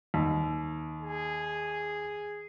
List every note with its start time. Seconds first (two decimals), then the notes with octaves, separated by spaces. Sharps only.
0.14 D#2
1.01 G#4